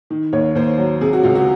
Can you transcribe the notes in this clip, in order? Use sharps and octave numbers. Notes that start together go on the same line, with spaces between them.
D#3
D#2 C#5
D#2 C5
F#3
C3 G#4
F#4
C#2 F4
F#4